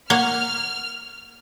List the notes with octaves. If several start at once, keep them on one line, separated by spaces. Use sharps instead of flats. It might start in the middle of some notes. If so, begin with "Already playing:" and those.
A#3 C#5 F#5 F6